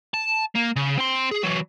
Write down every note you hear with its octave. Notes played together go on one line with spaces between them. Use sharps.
A5
A#3
C#3
C4 C6
G#4
E3 F#3